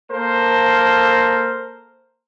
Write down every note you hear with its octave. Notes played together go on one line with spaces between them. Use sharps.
A#3 A4 A#4 C5